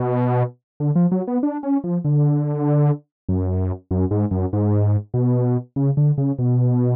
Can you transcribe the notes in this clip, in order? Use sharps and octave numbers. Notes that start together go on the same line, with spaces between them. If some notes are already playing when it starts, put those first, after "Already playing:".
Already playing: B2
D3
F3
F#3
B3
D4
C#4
F3
D3
F#2
F#2
G#2
F#2
G#2
B2
C#3
D3
C#3
B2